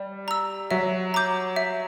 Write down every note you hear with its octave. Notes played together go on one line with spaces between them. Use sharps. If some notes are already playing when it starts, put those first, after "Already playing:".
Already playing: G3 D5
A#5 E6
F#3 E5
A#5 D6 G6
E5